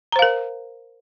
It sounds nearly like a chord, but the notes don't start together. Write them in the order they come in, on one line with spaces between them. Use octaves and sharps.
A#5 C5 F5 A#4